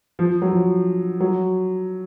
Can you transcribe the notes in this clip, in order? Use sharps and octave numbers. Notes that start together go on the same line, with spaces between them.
F3
F#3
F3
F#3